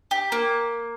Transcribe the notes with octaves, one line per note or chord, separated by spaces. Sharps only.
G4
A#3